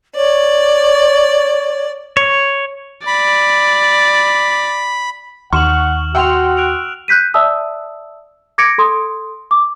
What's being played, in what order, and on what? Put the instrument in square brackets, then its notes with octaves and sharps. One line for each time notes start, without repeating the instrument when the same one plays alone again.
[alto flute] C#5 [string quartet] D5
[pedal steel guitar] C#5
[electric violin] D5 [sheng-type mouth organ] B5
[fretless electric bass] D#2 [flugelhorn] F#5 [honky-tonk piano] C#6 [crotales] F6 E7 F#7
[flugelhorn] F#4 [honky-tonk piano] F#5 G5 C6 [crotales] E6 F7
[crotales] F#6 D7 F7
[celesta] F#6 G6 B6 D#7
D5 E5 A5 D#6 E6
D6 G#6 A#6 C#7 D7
A4 C6 D#6
D6